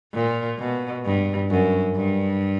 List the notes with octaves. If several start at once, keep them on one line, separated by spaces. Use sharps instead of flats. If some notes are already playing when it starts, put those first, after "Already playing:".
A#2
B2
G2
F#2
G2